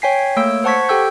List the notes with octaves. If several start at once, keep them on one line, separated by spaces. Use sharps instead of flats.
C#5 G5 G#5 B6 C7
A3 A#3 C#5 E6 D7
C5 F#5 A5 C#6 G#6 B6
G4 A4 G5 E6 G6